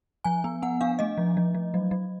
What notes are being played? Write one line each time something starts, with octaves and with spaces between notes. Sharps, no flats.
F3 G#5
B3
B3 F#5
D4 F5
A3 D#5
F3
F3
F3
F#3
F#3